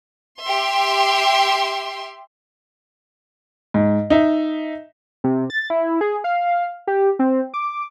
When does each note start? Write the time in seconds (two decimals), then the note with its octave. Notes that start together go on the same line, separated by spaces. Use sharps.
0.41 G4 E5 C6
3.74 G#2
4.10 D#4 E5
5.24 C3
5.50 A6
5.70 E4
6.01 G#4
6.24 F5
6.87 G4
7.19 C4
7.54 D6